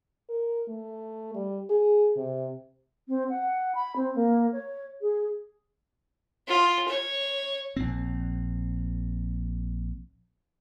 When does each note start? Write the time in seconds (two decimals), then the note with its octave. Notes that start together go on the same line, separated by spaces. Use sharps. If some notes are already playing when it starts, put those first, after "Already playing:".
0.29 A#4
0.68 A3
1.35 G3
1.70 G#4
2.17 C3
3.08 C4
3.30 F#5
3.75 B5
3.96 C4
4.15 A#3
4.52 C#5
5.01 G#4
6.47 F4
6.88 C#5
7.76 A#1 C4